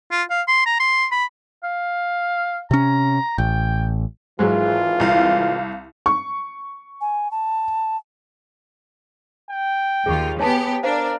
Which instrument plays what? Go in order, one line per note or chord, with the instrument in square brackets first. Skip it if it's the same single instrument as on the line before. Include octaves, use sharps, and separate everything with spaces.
[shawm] F4
F5
C6
A#5
C6
B5
F5
[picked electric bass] C3 C#4 [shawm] A#5
[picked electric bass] A1 [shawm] G5
[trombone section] G#1 E3 F4 [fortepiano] G#2 F#3 G#3
[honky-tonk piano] C2 F5 [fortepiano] A#5
[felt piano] C#6
[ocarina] G#5
A5
[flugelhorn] G5
[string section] D#2 F4 [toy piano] G#4 C#6
[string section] B3 G4 [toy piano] C#5 G#5 A5
[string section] D4 [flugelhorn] A#4 [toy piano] C5 F5